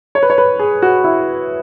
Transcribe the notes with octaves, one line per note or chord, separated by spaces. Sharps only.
C#5
B4
C#5
B4
G#4
F#4
E4